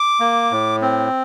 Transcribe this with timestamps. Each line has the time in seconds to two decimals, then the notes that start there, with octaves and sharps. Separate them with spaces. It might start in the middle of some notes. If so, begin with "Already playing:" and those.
Already playing: D6
0.20 A#3
0.52 A2
0.82 C4